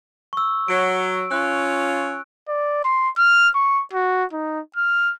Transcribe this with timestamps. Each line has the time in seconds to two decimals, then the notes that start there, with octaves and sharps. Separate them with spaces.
0.33 C#6 E6
0.68 F#3 D7
1.31 C#4 F4 F#6
2.48 D5
2.84 C6
3.17 F6
3.55 C#6
3.93 F#4
4.32 D#4
4.76 F6